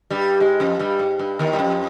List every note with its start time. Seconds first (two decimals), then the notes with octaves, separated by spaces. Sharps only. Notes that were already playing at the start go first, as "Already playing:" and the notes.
0.10 G2 G3
0.40 G#2 G#3
0.60 F2 F3
0.79 G2 G3
0.99 G#2
1.19 G2
1.39 D#2 D#3
1.53 G3
1.59 F2 F3